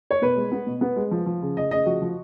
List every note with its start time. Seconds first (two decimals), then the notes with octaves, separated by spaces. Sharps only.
0.11 C#5
0.22 B2 B4
0.36 G#3
0.52 B3
0.67 B2
0.81 B3
0.96 G#3
1.11 F3
1.26 F3
1.42 C#3
1.57 C#3 D#5
1.71 C#3 D#5
1.86 F3 F#4
2.02 F3